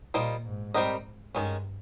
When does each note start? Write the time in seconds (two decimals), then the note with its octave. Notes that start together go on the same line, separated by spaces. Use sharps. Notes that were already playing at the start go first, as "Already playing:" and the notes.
0.14 A#2 G3 A#3 F4 C5 D#5
0.45 G#2
0.74 G3 C4 G4 A#4 D#5
1.34 G2 D#3 G#3 C#4